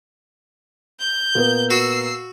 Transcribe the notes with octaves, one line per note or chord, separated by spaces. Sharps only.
G6
A#2 A#3 B3
F#4 E6 C7